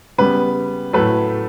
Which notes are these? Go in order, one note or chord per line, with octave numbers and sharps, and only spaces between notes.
C#3 G3 B3 B4
A2 F#3 A3 B4